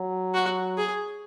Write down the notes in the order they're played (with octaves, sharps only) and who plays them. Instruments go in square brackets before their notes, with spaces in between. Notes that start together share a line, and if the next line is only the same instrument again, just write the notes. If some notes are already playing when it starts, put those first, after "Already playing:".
Already playing: [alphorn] F#3
[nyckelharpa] F#4
G#4